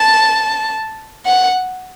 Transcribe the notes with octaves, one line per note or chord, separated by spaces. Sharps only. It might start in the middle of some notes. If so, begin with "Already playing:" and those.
Already playing: A5
F#5